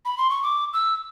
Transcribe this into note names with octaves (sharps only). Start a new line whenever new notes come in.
B5
C6
C#6
D6
E6